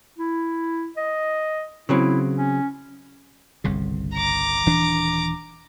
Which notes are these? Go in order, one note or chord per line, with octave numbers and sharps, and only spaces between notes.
E4
D#5
C#3 F#3 C4 E4
C#4
G1 C2 C#3
A#5 D6
D#1 E3 D4